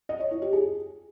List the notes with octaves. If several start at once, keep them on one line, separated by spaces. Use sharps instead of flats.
D#5
C#5
E4
G4
G#4